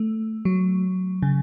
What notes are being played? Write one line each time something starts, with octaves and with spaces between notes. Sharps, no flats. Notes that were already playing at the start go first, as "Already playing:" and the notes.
Already playing: A3
F#3
C#3